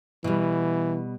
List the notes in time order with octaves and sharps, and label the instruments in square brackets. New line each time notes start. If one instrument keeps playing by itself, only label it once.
[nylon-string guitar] B2 G3 [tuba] E3